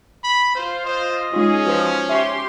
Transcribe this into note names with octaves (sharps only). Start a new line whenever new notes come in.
B5
F4 C5
C5 D#5
G#3 C#4 D#4 F4 G#4
F3 F#4 B4 C5
G4 E5 C6 C#6